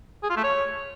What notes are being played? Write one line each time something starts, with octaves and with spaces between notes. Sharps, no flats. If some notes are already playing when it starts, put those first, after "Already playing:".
G#4
F4
A3
C#5